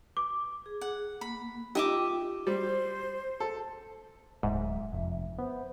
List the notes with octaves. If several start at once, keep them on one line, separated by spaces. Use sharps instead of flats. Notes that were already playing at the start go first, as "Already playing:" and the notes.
D6
G#4
F#5
A#3 B5
D#4 F4 G4 D#5 E5 G5 D6
G3 C5
A4
D1 G#2 E5
F1
B3 C5